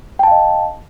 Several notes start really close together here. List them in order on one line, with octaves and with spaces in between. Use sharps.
G5 A5 F5 D#5